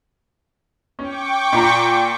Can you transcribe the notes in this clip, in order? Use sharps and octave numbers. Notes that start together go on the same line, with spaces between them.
C#4 G5 C#6 D6
A#2 A#5